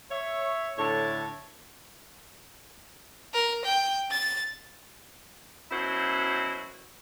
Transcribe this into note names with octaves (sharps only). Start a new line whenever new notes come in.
C#5 E5
A2 D3 C#5 A5
A#4
G5
A6
F#2 B2 E4 F#4 C5